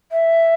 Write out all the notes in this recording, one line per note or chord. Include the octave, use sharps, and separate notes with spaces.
E5